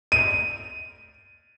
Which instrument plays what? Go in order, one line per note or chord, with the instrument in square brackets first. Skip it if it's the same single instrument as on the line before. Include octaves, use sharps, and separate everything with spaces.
[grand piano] D#7